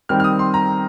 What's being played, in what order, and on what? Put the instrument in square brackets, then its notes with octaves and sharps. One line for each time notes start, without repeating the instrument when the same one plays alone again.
[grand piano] D#3 G3 C4 G4 [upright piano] F6
[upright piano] F6
D#6
C6
A#5